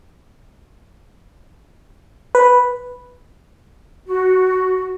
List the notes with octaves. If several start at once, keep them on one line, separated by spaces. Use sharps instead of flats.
B4
F#4